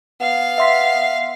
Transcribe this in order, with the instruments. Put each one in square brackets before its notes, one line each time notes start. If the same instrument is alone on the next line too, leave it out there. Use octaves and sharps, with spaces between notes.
[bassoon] B3 [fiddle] F5
[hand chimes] E5 C6 B6